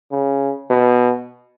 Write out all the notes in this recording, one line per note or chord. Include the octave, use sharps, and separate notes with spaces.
C#3
B2